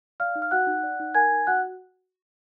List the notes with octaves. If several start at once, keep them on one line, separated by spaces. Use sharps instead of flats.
D5 F5 F6
D#4
F6
F#4 F#5 F#6
D#4
D5
D#4
A#4 G#5 G#6
D#4
F#4 F#5 F#6